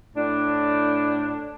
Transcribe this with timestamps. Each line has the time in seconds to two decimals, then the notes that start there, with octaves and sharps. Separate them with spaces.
0.16 A2 D4